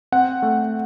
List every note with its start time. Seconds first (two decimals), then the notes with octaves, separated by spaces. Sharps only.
0.12 C4 F#5
0.42 A3